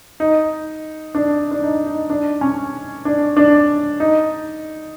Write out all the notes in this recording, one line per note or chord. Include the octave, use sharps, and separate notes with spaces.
D#4
D4
D4
D#4
D#4
D4
C#4
D4
D4
D#4